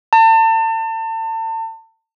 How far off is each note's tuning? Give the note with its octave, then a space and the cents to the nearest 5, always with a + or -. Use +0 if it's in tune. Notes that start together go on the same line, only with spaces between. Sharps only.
A5 +35